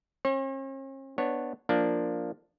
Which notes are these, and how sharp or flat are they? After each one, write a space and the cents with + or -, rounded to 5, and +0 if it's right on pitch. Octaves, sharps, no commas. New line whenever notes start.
C#4 -45 C#5 -45
B3 +0 D4 +5 C#5 -10
F3 +0 A#3 +0 D4 +0